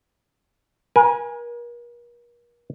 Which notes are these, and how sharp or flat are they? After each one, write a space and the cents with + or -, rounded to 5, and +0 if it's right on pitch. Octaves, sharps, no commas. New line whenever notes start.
A#4 +40 G#5 -5